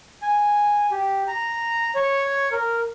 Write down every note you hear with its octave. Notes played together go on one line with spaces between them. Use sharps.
G#5
G4
A#5
C#5
A#4